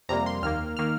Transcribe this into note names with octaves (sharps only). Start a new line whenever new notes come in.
F2 C3 G3 A#3 A#5
C6
D#2 D#3 A#3 F6
D#3 A#3 F6